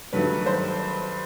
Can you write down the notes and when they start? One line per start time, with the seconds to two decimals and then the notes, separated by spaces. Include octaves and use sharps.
0.12 G2 D#3 F#3 A3 B4
0.46 C5